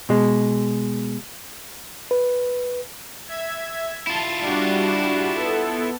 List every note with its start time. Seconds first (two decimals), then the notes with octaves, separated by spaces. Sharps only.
0.09 B2 G#3
2.11 B4
3.28 E5 G#6
4.07 E4 F4 A5
4.40 G3 D4 F#4
5.34 B3 A4